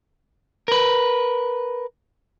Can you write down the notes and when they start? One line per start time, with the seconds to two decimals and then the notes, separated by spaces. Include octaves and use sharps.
0.68 A#4 B4